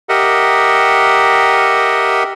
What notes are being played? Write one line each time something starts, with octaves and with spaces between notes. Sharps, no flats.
G4 A#4 D#5 E5 F#5